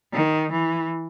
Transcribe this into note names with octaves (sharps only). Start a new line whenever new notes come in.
D#3
E3